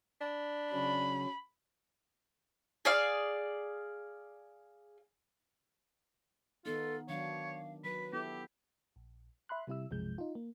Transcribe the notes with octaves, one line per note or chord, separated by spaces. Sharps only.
D4 B5
C#3 F#3 C#4 B5
G#4 D5 F5
D#3 B3 D#4 F4 A4
D#3 F#3 D4 C#5 F5
F#3 B4 B5
B3 E4 G4 A4
A#1
E5 B5 C6 F#6
C3 G3 E4 E5 E6
B1 F#2 C3 F3 G#3 G6
D#4 F4
A#3